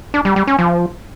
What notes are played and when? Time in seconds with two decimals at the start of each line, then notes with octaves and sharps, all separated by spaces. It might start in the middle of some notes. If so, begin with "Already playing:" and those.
0.14 D4
0.25 G3
0.36 G3
0.47 C#4
0.59 F3